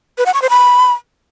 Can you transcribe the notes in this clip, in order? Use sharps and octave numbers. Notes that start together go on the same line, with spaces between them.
B4
F#5
C#6
C5
B5